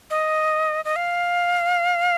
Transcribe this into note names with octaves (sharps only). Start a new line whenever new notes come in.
D#5
D#5
F5